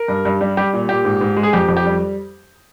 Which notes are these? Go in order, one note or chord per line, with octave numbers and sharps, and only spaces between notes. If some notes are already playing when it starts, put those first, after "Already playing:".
Already playing: A#4
G2
G2
G3
G3 G4
A#2
A#2 G4
G#2
G#2
G#3
G#4
F2 G4
F2
G4
G3